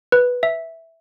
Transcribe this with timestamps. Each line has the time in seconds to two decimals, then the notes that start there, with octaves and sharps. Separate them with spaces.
0.12 B4
0.43 E5